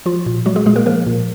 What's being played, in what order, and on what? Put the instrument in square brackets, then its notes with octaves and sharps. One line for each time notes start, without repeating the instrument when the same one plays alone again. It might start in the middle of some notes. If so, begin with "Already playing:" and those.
[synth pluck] F3 F4
A#2
F#3 G#3 F#4
G#3 G#4
A#2 G#3 G#4
A#3 A#4
F3 A#3 A#4
A#2